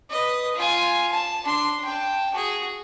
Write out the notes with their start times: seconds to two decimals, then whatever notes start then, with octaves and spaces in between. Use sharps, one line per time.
0.10 B4 D#5
0.55 F4 G#5
1.11 A5
1.44 D4 C6
1.85 G5 A5
2.34 F#4 G#4